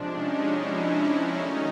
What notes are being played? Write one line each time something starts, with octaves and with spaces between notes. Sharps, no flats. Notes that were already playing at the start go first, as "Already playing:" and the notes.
Already playing: C3 F3 G#3 D4
C#4 D#4
D4 E4
D#3 F#3 A3 C#4 D#4